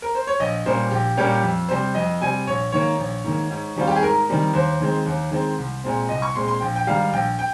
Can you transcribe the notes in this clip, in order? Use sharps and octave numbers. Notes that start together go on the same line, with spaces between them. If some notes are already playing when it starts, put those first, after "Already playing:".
A#4
C5
C#5
A#1 D#5
A#2 G3 A#3 C#4 C5
A#1 G4
A#2 G3 A#3 C#4 G4
F2
C3 G3 C4 C5
F2 D#5
C3 G3 C4 G#5
A#1 C#5
G#2 D#3 A#3 C#5
A#1
G#2 D#3 A#3
G#2
D#3 G3 C4 F4
G4
G#4
G#2 A#4
D#3 G3 C4
D#2 C5
D#3 G#3 C4
D#2
D#3 G#3 C4
C2
A#2 G#3 C4
C2 D#5
C#6
A#2 G#3 C4 C6
C6
A#1 G5
G5
G#2 D#3 G3 F5
A#1 G5
G5